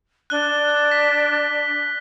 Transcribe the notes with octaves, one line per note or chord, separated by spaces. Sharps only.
D4 F#6 G7
B6